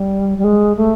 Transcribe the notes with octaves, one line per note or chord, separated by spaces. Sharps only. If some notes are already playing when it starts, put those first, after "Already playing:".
Already playing: G3
G3
G#3
A3